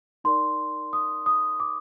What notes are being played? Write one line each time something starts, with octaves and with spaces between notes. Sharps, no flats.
D#4 A#4 D5 C6
D#6
D#6
D6